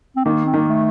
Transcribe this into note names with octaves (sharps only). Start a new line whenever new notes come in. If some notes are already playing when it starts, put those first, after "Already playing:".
C4
D#3 A#3
C4
D#3 A#3
A3